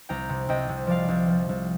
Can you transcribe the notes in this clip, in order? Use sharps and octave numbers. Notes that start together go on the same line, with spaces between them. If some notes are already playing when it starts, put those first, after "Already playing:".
C2 G5 A#5
C3
C2 D#5 G5
C3
F3 D5 F5
C2
F3
C2